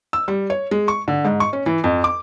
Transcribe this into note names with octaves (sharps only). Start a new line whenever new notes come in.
E6
G3
C#5
G#3
C#6
D3
G#2
C#6
C#4
E3
F2
D6